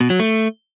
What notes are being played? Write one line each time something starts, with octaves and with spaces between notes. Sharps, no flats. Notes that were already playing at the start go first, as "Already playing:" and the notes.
B2
F#3
A3